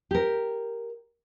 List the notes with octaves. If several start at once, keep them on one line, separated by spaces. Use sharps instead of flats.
G4 A#4